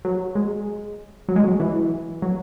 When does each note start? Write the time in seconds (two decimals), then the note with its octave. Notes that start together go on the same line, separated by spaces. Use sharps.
0.05 F#3
0.35 G#3
1.29 F#3
1.36 G#3
1.44 F#3
1.60 E3
2.22 F#3